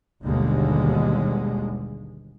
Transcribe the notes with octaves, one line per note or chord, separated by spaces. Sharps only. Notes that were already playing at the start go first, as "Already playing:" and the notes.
G1 D#2 B2 D3 G#3